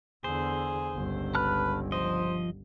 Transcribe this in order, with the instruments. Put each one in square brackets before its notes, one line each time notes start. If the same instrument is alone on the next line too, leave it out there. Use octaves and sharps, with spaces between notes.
[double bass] E2 D3 [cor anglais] G#4 [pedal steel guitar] C5
[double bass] G1 C#2
[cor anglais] B4 [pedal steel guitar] A5 F6 F#6
[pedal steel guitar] F3 D#5 [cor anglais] C5